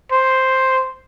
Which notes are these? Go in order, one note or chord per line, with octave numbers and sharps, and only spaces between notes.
C5